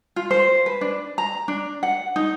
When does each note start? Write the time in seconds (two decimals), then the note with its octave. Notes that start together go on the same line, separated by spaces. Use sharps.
0.16 F4
0.31 C5
0.66 B4
0.81 D4
1.18 A#5
1.48 D4
1.83 F#5
2.16 D#4